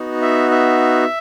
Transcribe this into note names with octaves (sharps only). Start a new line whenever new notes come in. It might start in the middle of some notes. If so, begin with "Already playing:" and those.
Already playing: B3 D#4 F#4
E5
E5